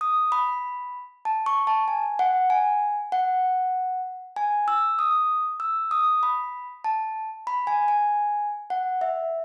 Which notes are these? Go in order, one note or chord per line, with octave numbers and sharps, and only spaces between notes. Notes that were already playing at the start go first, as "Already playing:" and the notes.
D#6
B5
A5
C#6
A5
G#5
F#5
G#5
F#5
G#5
E6
D#6
E6
D#6
B5
A5
B5
G#5
G#5
F#5
E5